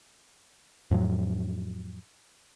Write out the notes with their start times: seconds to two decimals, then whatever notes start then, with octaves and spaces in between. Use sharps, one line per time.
0.91 F2 A2 F3 F#3